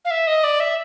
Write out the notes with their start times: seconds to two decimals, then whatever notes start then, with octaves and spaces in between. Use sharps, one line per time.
0.05 F5
0.11 E5
0.27 D#5
0.44 D5
0.60 E5